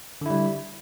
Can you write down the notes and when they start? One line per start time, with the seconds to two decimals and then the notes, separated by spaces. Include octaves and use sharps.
0.21 D3
0.26 E4
0.30 G3